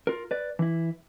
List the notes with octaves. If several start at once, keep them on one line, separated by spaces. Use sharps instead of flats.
F4 A#4
B4 D5
E3 E4